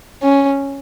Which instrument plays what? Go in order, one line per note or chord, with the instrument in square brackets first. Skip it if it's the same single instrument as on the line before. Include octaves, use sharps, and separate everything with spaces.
[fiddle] C#4